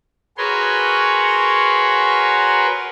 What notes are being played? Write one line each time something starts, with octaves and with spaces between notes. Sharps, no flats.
F#4 G#4 A#4 B4 C#5 C6